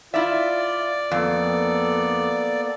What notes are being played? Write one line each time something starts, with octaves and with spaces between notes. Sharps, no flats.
E4 F4 D5 E5
F2 A#3 B3 A4